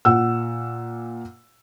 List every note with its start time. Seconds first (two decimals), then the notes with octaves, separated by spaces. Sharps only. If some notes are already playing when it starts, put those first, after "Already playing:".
0.05 A#2 F#5 E6